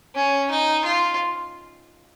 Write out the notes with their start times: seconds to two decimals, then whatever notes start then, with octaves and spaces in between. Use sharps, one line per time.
0.15 C#4
0.50 D#4
0.85 F4